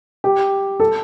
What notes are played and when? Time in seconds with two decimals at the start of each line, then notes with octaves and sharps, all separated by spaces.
0.24 G4
0.80 A4